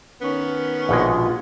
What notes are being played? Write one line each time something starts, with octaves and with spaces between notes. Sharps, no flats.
D#3 B3 C#4
A#1 B2 G#3 F4